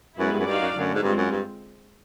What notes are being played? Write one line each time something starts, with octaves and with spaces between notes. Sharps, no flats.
F#2 G#3 B3 E4 G#4 B4
G2
F#2
G2 D#4 F#4 A#4 D5 F5
F#2
F#2 D3 F#3 A3
G#2
G2 G#3 C4 F4
F#2
G2